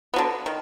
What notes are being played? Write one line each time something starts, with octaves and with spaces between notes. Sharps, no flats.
D3 F#3 B3
D#3